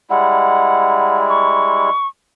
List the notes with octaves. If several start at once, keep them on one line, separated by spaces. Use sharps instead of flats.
G3 G#3 E4 F#5
C#6